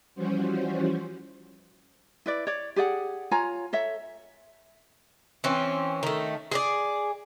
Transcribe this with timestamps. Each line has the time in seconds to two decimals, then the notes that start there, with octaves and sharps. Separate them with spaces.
0.15 E3 F3 G3 C#4 F#4 C5
2.26 E4 B4 D5
2.47 C#5 D5
2.76 G4 G#4 D5 F#5
3.31 F4 C#5 G#5 A#5
3.73 A4 C#5 E5
5.44 E3 C4 C#4
6.03 D#3 A3
6.51 G#4 B4 D5